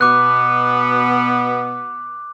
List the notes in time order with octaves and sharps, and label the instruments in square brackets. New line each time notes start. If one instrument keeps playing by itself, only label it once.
[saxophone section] B2 B3 [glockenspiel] D6 F#6